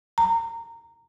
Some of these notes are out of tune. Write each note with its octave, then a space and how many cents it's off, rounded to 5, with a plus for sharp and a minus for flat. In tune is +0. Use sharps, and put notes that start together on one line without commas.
A#5 -15